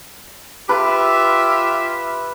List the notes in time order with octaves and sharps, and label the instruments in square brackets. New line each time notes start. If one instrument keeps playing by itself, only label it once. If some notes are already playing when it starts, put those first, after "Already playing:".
[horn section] F4 G4 E5 [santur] B4